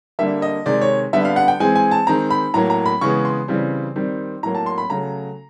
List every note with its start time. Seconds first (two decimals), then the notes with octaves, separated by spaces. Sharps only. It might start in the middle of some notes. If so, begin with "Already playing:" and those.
0.19 D3 G3 A#3 E5
0.42 D#5
0.66 C3 D#3 G#3 D5
0.81 C#5
1.13 D3 G3 B3 E5
1.25 F5
1.36 F#5
1.48 G5
1.60 E3 G#3 C4 G#5
1.75 G#5
1.91 A5
2.07 D#3 G#3 C4 A#5
2.30 B5
2.54 A2 F#3 A#3 A#5
2.70 A#5
2.86 B5
3.01 C#3 E3 G#3 B3 C#6
3.25 C6
3.48 C#3 E3 G3 C4
3.96 D#3 G3 C4
4.43 A2 F#3 A#3 A#5
4.55 A5
4.66 C6
4.78 B5
4.90 C#3 F#3 A3 A#5